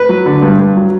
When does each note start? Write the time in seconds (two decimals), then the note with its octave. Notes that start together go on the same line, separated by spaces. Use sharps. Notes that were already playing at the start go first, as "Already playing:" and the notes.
Already playing: B4
0.09 F#3
0.26 D3
0.42 G2
0.59 G2
0.77 F#3